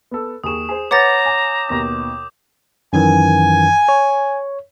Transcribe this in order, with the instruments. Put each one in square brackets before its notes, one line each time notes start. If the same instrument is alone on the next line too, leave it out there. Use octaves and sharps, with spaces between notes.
[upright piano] B3 A4
[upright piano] D#2 G#4 C#6 [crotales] D#6 E7
[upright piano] G#4 C5
[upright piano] B4 [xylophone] C#5 F#5 A6 [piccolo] A#5 [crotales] D6 G6
[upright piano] G#5 [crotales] D6
[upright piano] D#2 B2 A#6
[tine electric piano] F#2 D#3 E3 [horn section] G#5
[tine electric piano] C#5